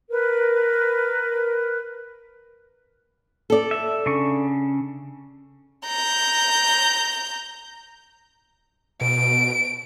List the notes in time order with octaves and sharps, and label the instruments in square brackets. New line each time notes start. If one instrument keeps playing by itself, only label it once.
[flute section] A#4 B4
[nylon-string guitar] A4 D5
[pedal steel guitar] E5
C#3 D4 C#6
[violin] A#5 G6
[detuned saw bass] B2 [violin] D7